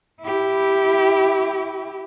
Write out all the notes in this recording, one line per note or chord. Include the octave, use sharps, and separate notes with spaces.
E4 G4